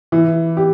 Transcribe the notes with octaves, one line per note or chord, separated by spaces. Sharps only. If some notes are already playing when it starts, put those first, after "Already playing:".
E3
G4